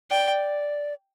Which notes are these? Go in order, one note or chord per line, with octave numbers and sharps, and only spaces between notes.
D5 G5